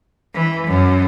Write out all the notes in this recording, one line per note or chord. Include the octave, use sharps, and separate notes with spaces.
E3
F#2